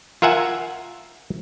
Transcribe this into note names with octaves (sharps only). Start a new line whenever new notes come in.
F4 A#4 E5 F#5 G#5